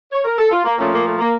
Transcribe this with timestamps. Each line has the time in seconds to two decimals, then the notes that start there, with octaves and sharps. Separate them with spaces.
0.13 C#5
0.25 A#4
0.39 A4
0.51 F4
0.65 A#3
0.78 A#2 F3 A3 C#4
0.92 A#3
1.06 A3
1.18 A#3